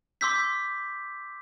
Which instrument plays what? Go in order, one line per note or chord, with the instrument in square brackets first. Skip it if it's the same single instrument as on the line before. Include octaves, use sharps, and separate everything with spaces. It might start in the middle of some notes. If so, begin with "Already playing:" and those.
[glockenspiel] C6 D6 E6 G6 B6